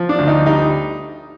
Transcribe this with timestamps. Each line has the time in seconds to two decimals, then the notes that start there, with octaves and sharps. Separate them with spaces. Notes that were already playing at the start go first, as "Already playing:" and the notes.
Already playing: F3
0.09 D4
0.19 D2
0.28 D#4
0.46 G3 D#4